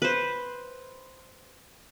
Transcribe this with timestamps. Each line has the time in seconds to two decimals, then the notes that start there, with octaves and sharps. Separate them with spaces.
0.02 B4 C5